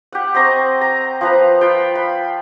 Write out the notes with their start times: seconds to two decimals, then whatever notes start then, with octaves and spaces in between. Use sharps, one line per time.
0.12 G4 F#5
0.34 C4 D#5 A#5 C#6
0.81 A#5
1.21 F3 B4 A#5
1.61 F4 B4 G5
1.95 B5